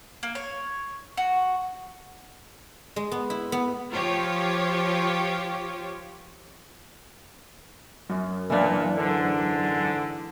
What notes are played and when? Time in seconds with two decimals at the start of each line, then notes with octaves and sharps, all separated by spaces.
0.23 A#3
0.35 C#5
1.17 F#4
2.96 G#3
3.12 B3
3.30 E4
3.52 B3
3.91 F3 F4 G4 C#5
8.10 F#2
8.50 A#2 E3 D4
8.96 G#2 D3